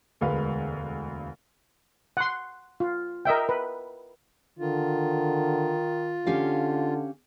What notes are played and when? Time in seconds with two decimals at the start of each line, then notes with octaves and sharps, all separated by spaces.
0.21 E1 D2 G#3 B4 F5
2.17 F#5 C6
2.80 F4
3.25 A#4 D#5 E5 G5
3.49 B4
4.59 D3 D#3 F4
6.27 D3 C#4 G4 F5